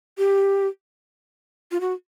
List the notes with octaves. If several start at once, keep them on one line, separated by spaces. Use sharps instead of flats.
G4
F4
F#4